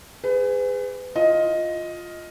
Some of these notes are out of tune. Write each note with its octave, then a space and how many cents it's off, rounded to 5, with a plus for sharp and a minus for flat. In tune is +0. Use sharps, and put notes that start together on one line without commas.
G#4 -15 B4 +35
F4 +5 D#5 +10